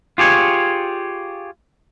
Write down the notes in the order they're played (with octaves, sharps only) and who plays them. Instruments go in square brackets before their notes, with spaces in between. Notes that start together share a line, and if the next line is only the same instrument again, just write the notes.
[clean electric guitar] F4 G4 G#4 C#5